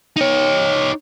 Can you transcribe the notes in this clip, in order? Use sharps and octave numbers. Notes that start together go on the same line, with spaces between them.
D#4 C#5